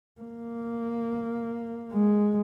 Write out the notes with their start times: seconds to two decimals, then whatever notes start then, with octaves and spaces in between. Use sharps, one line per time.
0.21 A#3
1.93 G#3